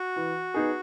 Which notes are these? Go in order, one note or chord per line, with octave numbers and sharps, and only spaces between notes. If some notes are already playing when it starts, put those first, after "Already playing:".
Already playing: F#4
E3
B3 D#4 G#4